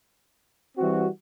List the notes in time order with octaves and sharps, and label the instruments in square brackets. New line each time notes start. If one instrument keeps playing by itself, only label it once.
[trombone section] E3 G3 C4 F#4